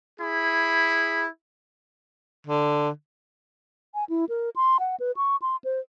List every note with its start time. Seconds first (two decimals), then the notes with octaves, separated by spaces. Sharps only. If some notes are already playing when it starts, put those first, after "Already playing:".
0.21 E4 G#4 B5
2.47 D3
3.94 G#5
4.09 E4
4.29 A#4
4.56 C6
4.80 F#5
5.00 B4
5.17 C#6
5.42 C6
5.64 C5